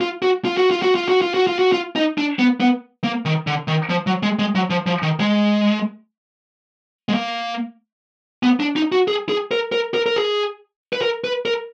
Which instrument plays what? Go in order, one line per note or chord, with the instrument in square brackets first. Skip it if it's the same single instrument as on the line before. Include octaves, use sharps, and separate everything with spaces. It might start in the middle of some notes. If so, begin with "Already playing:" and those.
[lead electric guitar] F4
F#4
F4
F#4
F4
F#4
F4
F#4
F4
F#4
F4
F#4
F4
D#4
D4
B3
B3
A#3
D#3
D3
D#3
F3
F#3
G#3
G#3
F#3
F3
F3
D#3
G#3
G#3
A#3
B3
D4
D#4
F#4
G#4
G#4
A#4
A#4
A#4
A#4
G#4
B4
A#4
B4
A#4